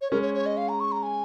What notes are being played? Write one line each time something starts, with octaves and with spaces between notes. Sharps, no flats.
C#5
G#3 C#4 A#4
C#5
C#5
D#5
F5
A#5
C#6
A#5
G#5